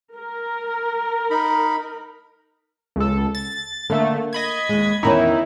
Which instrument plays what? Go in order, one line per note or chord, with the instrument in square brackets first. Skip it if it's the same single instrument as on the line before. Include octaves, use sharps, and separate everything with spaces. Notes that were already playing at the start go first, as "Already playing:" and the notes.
[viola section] A#4
[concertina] D#4 B5
[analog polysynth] C#2 A4
A6
[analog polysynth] D3 A3 [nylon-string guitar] A#3 A#4
[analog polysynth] D#5 B5 G#6
[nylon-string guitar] D#2 G#3
[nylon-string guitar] E2 D#3 C#4 [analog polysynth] D#4 E4